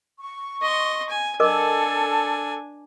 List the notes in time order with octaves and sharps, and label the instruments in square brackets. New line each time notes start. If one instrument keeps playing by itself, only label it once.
[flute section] C#6
[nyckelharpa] D#5 C6
G#5
[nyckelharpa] D4 G#5 [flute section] A4 [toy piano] A#4 D#5 D6